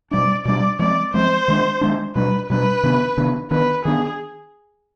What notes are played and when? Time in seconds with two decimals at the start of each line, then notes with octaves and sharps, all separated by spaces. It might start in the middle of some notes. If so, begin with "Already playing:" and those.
0.11 B2 G3 D4 D5
0.45 B2 G3 D4 D5
0.79 F3 G#3 C4 D5
1.14 F3 G#3 C4 C5
1.48 D#3 G#3 D4
1.81 D#3 G#3 D4
2.15 B2 G3 D4 B4
2.50 B2 G3 D4 B4
2.83 C3 D#3 B3 D4
3.17 C3 D#3 B3 D4
3.51 D#3 B3 D4 B4
3.85 D#3 B3 D4 G#4